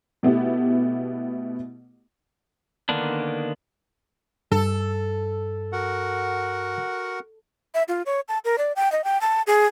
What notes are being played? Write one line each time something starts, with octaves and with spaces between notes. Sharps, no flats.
B2 A3 B3 E4 G4
D3 D#3 A#3 B3 D4
G2 A4
F#4 A#4 F#5
E5
F4
C#5
A5
A#4
D5
G5
D#5
G5
A5
G#4